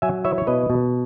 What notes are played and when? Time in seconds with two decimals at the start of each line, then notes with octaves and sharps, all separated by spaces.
0.02 F#3 E5 G#5
0.24 E4 C#5 E5
0.38 C#5
0.47 B2 B4 D#5
0.70 B2